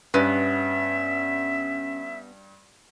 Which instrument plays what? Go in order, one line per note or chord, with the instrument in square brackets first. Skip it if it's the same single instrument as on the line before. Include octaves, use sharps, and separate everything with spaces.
[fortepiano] G2 [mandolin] B3 [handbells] C#4 [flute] E5